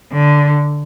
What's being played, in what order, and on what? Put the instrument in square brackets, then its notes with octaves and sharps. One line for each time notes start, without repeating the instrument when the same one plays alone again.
[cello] D3